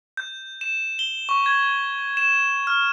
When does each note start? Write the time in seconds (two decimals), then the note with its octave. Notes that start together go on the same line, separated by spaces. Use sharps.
0.17 G6
0.61 E7
0.99 G7
1.29 C#6
1.46 G#6
2.17 E7
2.67 F6